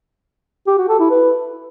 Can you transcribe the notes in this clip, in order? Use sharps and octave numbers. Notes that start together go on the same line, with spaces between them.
G4
F#4
A4
E4
B4